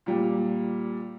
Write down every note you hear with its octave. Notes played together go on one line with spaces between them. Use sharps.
A#2 G3